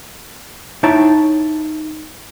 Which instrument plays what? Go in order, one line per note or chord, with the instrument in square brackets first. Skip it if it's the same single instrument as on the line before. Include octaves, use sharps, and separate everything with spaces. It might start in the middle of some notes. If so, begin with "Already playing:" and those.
[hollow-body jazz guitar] D#4 E4 C#5 G5 A5